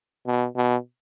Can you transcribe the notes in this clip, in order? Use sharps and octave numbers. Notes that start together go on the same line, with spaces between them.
B2
B2